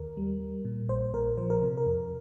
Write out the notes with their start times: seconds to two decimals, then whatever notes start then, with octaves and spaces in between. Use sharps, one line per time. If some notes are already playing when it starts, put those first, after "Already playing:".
Already playing: D#2 A#4
0.17 G3
0.41 G3
0.65 A#2
0.89 A#1 C5
1.13 A#2 A#4
1.37 F3 C5
1.50 A#4
1.62 C3
1.77 A#4
1.87 F2